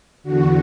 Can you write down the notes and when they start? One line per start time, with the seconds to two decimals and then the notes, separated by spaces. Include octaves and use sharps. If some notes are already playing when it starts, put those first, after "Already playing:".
0.23 E2 D3 F#4